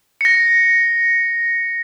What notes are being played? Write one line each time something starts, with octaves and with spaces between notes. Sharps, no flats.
A#6 C#7